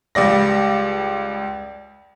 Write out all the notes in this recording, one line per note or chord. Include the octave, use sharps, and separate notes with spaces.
C#2 G3 D5 A#6